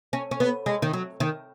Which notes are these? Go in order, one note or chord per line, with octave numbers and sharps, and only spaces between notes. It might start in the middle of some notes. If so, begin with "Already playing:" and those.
C#4
C#4
B3
G#3
D#3
F#3
D#3